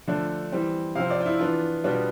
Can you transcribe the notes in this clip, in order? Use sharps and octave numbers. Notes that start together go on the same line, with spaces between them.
D3 F3 A3 D4
E3 G3 C4
C3 F3 C4 F5
D5
F4
E4
E3 B3 D4 F4
B2 G3 B3 D4 F4